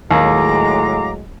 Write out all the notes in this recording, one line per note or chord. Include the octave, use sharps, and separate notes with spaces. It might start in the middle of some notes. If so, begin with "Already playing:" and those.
D#2 A2 F#3 G#3 F5 A#5 D6